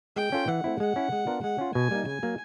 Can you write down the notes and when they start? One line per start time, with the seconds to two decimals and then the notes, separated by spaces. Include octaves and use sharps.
0.16 G#3 G5
0.32 C#4 F4 A4 C#5
0.48 E3 F#5
0.64 A3 C4 E4
0.80 G#3 F#5
0.96 C#4 E4
1.12 G#3
1.27 B3 D4 F4 A#4
1.43 G#3 F#5
1.58 C#4 F4
1.74 B2 G#5
1.91 G3 A#3 D#4
2.06 C#3 G#5
2.23 F#3 A#3